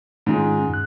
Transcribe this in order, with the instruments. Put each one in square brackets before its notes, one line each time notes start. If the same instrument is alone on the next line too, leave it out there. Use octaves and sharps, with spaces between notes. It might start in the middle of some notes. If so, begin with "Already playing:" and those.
[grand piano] G#2 G#3 [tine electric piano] D#3 C#4 F4
[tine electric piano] G2 F#6